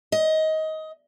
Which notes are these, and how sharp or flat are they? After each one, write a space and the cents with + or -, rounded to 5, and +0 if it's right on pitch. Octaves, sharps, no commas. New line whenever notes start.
D#5 +20